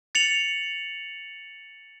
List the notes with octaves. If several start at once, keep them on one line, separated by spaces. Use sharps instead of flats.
A6 C#7 F7 F#7